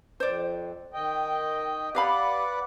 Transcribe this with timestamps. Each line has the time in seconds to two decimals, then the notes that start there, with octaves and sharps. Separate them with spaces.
0.20 F2 C5 D5
0.94 D#3 D#5 G5
1.95 G4 B4 D5 F5 F#5 B5